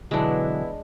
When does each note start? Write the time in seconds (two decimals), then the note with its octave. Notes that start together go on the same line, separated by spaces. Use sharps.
0.11 B2 D3 E3 F#3 G#3 B3 D4 E4